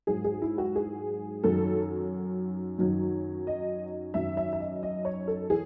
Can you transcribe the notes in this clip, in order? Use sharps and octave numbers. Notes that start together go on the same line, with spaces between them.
G#2 F#3 G#4
G#4
E4
F#4
G#4
F#2 D#3 F#3 A4
F#2 D#3 F#3
D#5
F#2 D#3 F#3 E5
E5
E5
D#5
D#5
C#5
A4
E3 G#4